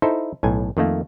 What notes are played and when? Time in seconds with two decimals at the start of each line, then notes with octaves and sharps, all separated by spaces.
0.02 D#4 E4 A4 C5
0.43 B1 A2 G#5
0.77 F2 D#3 A3 A#3